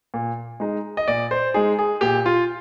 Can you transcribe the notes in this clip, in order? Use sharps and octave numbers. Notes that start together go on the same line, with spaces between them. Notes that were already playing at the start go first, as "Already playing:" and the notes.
A#2
G#3 D#4
D#5
A#2 D5
C5
G#3 D#4 G#4
G#4
A#2 G4
F4